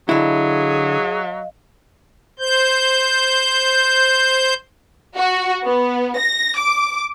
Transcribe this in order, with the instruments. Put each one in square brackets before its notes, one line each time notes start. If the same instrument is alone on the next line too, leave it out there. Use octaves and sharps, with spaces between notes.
[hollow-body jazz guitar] D3 E4 [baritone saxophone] F#3 [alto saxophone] G#4 [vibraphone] D#5 F5
[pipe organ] C5 G6
[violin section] F#4
B3
A#6
D6